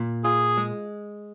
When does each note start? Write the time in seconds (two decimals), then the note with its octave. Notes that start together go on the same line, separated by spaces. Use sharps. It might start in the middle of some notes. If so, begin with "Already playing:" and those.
Already playing: A#2
0.24 F4 G#4
0.57 G#3